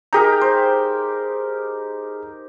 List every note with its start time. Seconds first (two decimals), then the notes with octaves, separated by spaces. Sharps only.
0.13 D#4 G4 G#4 A#4 A#5
0.41 C5